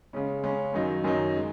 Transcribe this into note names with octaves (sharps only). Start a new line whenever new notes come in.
C#3 G#3 C#4
C#3 G#3 C#4
F#2 D#3 F#3 D#4
F#2 D#3 F#3 D#4
G#3